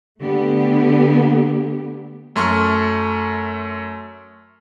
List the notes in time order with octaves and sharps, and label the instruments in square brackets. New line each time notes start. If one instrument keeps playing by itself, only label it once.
[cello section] D3 A3 B3 G4
[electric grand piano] F#2 A3 C6 C#6 F6